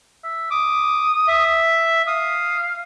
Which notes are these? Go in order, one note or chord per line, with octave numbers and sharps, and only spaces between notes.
E5
D6 D#6
E5
F5 D#6